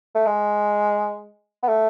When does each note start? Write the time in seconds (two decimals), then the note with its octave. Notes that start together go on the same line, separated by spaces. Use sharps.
0.15 A3
0.26 G#3
1.63 B3
1.69 A3